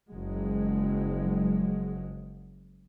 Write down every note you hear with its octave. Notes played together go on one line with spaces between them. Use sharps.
F#1 F3 F#3 G#3